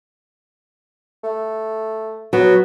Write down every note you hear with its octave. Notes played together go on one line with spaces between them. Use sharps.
A3
F#3 B3